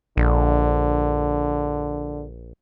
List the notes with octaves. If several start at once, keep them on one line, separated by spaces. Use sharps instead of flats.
A#1 D3